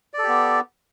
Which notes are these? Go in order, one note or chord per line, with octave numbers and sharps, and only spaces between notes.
B3 G4 A4 D5